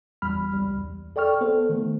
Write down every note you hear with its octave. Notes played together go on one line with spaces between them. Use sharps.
G1 E2 G3 B5 F6
C#2 G3
E2
A4 D5 G5 C#6 F6
B3 A4 C5
D#3 A3